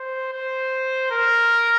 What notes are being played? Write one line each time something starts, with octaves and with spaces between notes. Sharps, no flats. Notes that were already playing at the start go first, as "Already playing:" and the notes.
Already playing: C5
C5
A#4